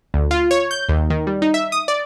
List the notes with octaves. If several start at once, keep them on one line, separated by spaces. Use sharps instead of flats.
D2
F4
C#5
G6
D#2
D#3
G3
D#4
E5
D#6
D5